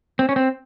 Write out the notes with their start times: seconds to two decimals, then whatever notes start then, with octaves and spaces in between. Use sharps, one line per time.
0.19 C4
0.29 C#4
0.36 C4